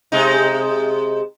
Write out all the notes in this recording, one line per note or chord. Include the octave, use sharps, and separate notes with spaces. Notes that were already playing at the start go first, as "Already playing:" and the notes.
C3 G#3 D#4